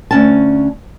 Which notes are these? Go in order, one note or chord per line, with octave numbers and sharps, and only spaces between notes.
D2 C#4 A5